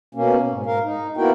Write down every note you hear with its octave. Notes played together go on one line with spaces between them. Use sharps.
B2 A#3 C#4
G#2
G#2 A#4 F5
D#4
A#3 B3 E4 F#4 A#4 G5